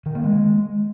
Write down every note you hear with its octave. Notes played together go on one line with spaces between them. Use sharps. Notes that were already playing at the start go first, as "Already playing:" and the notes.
D#3
A#3
G#3